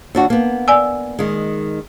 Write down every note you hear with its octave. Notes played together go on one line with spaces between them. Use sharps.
D#2 D4 F#4
A#3 B3
D5 G#5 E6
D#3 G#3